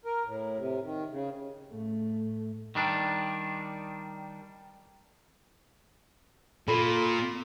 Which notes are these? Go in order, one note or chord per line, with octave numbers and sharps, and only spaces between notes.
A#4
A2
C3
D#3
C#3
A2 A3
D#3 G3 D4
A#2 F4 A4 B5